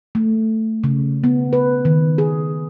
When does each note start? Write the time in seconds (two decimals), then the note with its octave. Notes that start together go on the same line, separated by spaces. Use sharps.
0.15 A3
0.84 C#3
1.24 B3
1.53 B4
1.85 D#3
2.18 G#4